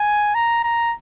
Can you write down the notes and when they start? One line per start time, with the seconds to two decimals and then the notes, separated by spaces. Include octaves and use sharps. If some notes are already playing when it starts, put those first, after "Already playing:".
Already playing: G#5
0.35 A#5
0.64 A#5